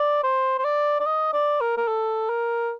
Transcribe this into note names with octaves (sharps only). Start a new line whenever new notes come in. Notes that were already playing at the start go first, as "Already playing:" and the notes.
Already playing: D5
C5
C5
D5
D5
D#5
D5
A#4
A#4
A4
A#4